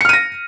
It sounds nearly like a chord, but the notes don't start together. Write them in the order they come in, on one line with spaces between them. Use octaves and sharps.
C#7 F6 D#7 A#6